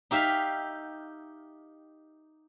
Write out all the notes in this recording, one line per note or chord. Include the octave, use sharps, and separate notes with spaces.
D#4 G4 E5 F5